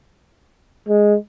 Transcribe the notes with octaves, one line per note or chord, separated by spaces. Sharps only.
G#3